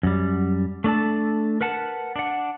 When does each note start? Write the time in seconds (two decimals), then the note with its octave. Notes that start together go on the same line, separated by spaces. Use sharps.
0.03 F#2 G3
0.84 A3 D4 A4 A5
1.61 A#4 B4 F#5 A5
2.16 D4 F#5